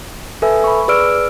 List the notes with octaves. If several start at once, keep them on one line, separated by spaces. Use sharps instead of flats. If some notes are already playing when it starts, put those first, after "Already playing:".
A4 B4 E5 G#5 E6
B5 C#6
G#4 B4 D5 E6 F6 D7